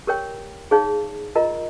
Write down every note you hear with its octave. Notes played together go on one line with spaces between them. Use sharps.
G4 A#4 C#5 G5
D#4 G#4 C#5 F5
F4 A#4 D#5 A#5